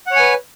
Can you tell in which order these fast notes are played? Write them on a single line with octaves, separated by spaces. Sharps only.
F#5 C#5 G#5 B4